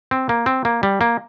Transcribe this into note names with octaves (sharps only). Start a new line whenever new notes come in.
C4
A#3
C4
A#3
G3
A#3